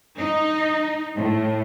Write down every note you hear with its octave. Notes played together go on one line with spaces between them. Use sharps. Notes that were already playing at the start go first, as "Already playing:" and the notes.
D#4
A2